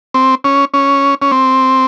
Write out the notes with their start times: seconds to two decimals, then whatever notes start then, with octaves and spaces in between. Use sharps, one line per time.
0.14 C4
0.44 C#4
0.74 C#4
1.22 C#4
1.32 C4